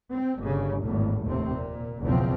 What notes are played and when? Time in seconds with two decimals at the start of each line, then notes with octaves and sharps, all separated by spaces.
0.10 C4
0.40 G1 C#3
0.84 G#1 E2 A2
1.25 F1 D#2 A2 C3 C4
1.56 A#2
2.02 F#1 B1 E2 C#3 F3 C4